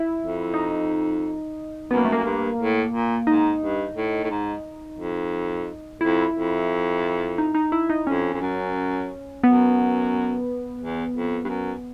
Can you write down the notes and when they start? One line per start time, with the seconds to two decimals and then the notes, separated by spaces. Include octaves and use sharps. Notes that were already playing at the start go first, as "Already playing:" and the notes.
Already playing: E4
0.20 F2
0.54 D#4
1.90 F#2 B3
1.97 A#3
2.05 A3
2.12 F#2 A#3
2.25 G2
2.59 A2
2.93 A#2
3.27 G#2 D#4
3.61 G2
3.96 A2
4.23 A2
4.30 G#2
4.99 F2
6.01 F2 E4
6.36 F2
7.38 D#4
7.55 D#4
7.72 E4
7.90 D#4
8.06 F2 C#4
8.33 F2
8.41 F#2
9.43 F#2 B3
10.80 E2
11.14 F2
11.45 G2
11.48 F#2